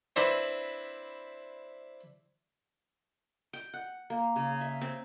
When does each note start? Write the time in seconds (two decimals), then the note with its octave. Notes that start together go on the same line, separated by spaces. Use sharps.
0.16 C4 D4 E4 B4 C5
3.53 G5
3.74 F#5
4.10 A#3
4.36 C#3
4.61 E5
4.81 C4